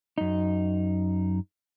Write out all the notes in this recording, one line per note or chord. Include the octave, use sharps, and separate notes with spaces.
F#2 D#4